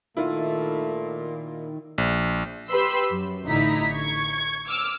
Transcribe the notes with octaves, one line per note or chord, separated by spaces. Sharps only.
A#2 D#3 A3 E4 F4
A#1
G4 B4 B5 C6 E6
F#2
A1 D3 D#4 E4 A#5 B6
C#6 G#6
D6 E6 F6